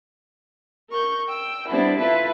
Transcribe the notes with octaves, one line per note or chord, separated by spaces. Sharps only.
A#4 C#6 G6
G5 E6
G3 B3 C4 D4 E4
E4 F4 A4 B4 E5